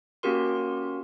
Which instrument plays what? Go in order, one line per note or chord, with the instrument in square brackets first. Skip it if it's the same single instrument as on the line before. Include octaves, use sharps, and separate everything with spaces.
[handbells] A#3 C#4 F#4 G4 A#4 C6